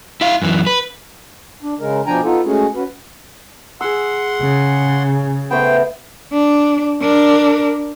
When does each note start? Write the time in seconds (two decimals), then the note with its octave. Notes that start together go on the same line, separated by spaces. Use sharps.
0.21 E4 F5
0.42 F#2 E3
0.67 B4
1.63 D4
1.80 C#3 G#3 A#4
2.07 B2 F3 D4 G5 G#5 A#5
2.24 B3 D#4 F4 A4
2.46 G#3 A3 C#4 F#4 G#4
2.75 C#4 F#4 B4
3.81 G#4 F#5 C6 E6
4.42 C#3
5.51 A3 B3 C5 G5
6.32 D4
7.01 D4 A#4